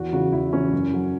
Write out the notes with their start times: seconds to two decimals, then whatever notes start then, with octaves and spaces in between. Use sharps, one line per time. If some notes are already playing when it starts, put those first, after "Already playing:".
Already playing: E2 F#4
0.13 C#3 E3 F#4
0.32 E2 E4
0.53 C#3 E3 C#4
0.72 F#2
0.93 F#3